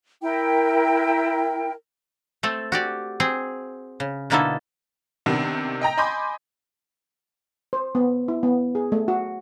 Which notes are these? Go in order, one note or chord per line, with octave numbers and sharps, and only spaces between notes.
E4 A#4 G5
A3 C4 A4
F#4 G4 D5
C4 G#4
C#3
B2 D3 A#3 D#4 E4 A4
C3 D#3 B3 D4
D#5 G5 A#5 A#6
D#5 G#5 B5 C6 D6 G6
C5
B3
E4
B3
G#4
A3
F#4